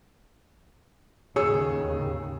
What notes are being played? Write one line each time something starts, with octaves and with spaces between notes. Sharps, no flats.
D#2 A2 C#3 G#4 C#5 E6